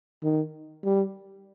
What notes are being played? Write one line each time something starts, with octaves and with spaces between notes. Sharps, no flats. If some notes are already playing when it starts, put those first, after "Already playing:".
D#3
G3